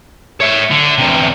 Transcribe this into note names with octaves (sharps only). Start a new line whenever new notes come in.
C#5 E5
D3
E2 C3